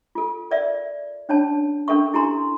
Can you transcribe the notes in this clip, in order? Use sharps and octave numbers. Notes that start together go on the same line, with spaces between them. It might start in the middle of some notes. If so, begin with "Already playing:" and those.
F4 A4
A#4 D5 E5
C#4 D4 C#5 A5
C#4 D4 A4 A#4 E5 C#6
E4 G4 A4 G#5 A#5 C6